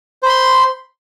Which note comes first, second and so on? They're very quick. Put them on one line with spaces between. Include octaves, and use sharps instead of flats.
C5 B5 C6